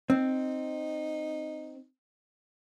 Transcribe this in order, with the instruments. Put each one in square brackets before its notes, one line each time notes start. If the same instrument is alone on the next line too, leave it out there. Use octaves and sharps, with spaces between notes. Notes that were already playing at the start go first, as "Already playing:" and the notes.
[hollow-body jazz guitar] C4 [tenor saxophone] D#4